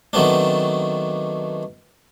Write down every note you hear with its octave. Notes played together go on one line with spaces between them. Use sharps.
D#3 F#3 A3 B3 C4 D4